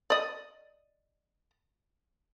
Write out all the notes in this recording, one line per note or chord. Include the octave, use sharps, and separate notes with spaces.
D5 D#5